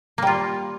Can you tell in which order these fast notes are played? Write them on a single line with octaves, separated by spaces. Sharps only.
A#3 G3 F4